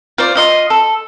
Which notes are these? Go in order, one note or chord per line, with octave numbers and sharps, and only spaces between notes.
F4 C5 D5
F4 D#5 C6
A4